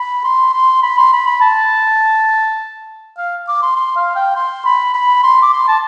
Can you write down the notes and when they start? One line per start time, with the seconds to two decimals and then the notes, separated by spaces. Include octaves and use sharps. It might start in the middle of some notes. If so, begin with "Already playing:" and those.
Already playing: B5
0.24 C6
0.54 C6
0.83 B5
0.98 C6
1.13 B5
1.27 B5
1.41 A5
3.18 F5
3.48 D6
3.62 C6
3.76 C6
3.96 F5
4.16 G5
4.36 C6
4.65 B5
4.94 B5
5.23 C6
5.42 D6
5.53 C6
5.68 A5